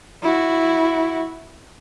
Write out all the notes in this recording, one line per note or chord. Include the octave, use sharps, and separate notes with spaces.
E4 F#4